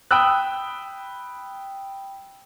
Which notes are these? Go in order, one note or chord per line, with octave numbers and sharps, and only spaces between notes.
G5 B5 D#6 E6 F#6